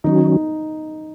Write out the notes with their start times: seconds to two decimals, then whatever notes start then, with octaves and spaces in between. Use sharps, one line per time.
0.04 D#3 F#3 C#4 D#4 F#4
0.27 D#4